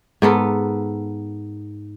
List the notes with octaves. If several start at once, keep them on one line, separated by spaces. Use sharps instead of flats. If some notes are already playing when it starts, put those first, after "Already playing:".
G#2 B3 A4 A#4